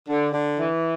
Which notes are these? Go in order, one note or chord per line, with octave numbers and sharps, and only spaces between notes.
D3
D3
E3